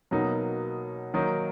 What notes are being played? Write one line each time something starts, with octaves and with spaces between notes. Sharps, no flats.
B2 F#3 A#3 D#4
D#3 F#3 A#3 D#4